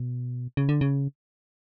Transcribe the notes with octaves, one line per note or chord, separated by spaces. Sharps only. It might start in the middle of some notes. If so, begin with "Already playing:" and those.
Already playing: B2
C#3
D3
C#3